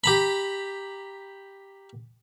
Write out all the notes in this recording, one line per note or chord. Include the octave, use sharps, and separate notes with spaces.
G4 A#5 B5